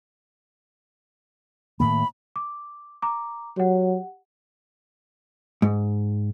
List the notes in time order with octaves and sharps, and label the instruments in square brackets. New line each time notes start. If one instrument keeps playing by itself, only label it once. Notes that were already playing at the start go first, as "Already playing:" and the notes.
[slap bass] A2 D#3 A#3 [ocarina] B5
[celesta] D6
A#5 D6
[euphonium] F#3 [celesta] G4 F#5
[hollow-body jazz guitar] G#2